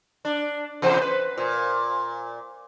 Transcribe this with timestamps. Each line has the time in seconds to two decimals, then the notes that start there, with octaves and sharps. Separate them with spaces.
0.25 D4
0.82 E2 C3 C5
1.02 B4
1.38 A#2